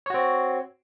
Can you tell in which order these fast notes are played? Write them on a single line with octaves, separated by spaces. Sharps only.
C#5 F#4 C4